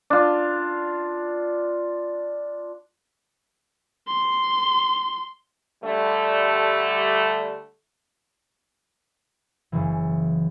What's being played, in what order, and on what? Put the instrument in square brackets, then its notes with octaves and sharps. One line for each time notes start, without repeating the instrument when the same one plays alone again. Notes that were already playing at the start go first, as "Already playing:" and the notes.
[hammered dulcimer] D4 F4
[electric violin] C6
[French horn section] D3 G3 A3
[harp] F#1 E3